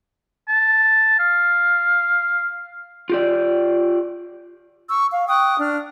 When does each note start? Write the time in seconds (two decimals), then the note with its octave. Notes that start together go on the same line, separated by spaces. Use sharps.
0.48 A5
1.19 F5
3.09 F4 G4 D5
4.89 C#6 E6
5.12 F5
5.29 G5 C#6 D#6 F#6
5.58 D4 F6